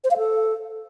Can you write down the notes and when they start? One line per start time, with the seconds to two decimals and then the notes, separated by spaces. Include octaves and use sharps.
0.04 C5
0.11 F5
0.17 A4